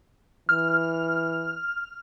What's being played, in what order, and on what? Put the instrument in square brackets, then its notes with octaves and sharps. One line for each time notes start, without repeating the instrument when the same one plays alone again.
[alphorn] E3 [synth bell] F6